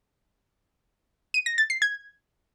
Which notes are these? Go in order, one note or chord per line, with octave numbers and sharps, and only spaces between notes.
D#7
A#6
A6
C7
G#6